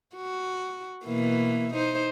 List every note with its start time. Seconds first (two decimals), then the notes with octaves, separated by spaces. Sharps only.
0.16 F#4
1.05 B2 E3 A#3
1.74 D#4 C5